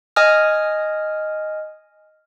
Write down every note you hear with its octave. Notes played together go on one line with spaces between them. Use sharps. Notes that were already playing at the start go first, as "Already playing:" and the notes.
D#5 G#5 D#6 F6